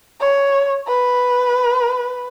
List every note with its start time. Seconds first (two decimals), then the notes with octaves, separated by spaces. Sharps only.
0.20 C#5
0.88 B4